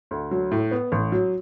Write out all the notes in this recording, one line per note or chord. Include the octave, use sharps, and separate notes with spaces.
D2
F#3
A2
B3
A1
F#3